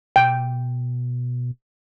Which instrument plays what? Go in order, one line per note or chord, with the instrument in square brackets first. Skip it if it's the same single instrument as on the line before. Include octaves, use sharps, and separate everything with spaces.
[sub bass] B2 [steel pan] G5